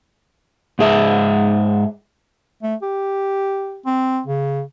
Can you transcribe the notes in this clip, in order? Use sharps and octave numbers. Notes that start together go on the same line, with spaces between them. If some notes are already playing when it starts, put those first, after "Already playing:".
G#2 G#4 E5
A3
G4
C4
C#3